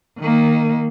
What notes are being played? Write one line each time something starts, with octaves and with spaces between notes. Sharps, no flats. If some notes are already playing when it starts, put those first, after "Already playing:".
D#3 A#3